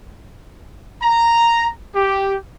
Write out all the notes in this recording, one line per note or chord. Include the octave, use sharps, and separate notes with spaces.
A#5
G4